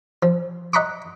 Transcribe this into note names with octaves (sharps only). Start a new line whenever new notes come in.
F3
D#5 F#5 A#5 B5 C#6 D6